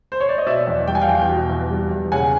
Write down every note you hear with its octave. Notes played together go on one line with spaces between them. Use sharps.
C5
C#5
D5
D#5
B2 D5 E5
E2
G3 G5
G#5
F5 G5
E2
B2
E2
G3
E2
C#3 F#5 G#5